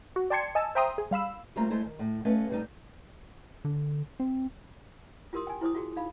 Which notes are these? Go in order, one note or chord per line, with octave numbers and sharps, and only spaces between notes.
F#4
D5 G5 A5 C6 G#6 C#7
D#5 G#5 A5 E6
C5 E5 G5 A#5 C6 D#6
G#4
G3 F5 B5 E6
G3 A3 A#3 C4 F4 A#5
G#3 A3 E4 A4 C5
D#3
A2
A3 C#4 B4 D#5 F5
A2 D3 G3 D#4
D3
C4
F4 G4 A#4 C6 D#6
G5 G#5
E4 C5 D6 D#6
F4 F#4 G#4
D#4 F5 B5